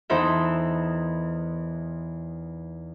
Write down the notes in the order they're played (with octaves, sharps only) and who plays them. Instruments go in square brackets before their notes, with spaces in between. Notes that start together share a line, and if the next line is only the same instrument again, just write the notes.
[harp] E2 E3 D#4 A4 C5 E5